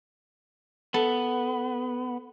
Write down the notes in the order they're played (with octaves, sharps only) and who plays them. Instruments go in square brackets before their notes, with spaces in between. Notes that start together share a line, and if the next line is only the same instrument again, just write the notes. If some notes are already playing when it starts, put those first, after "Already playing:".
[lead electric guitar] B3 [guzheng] A4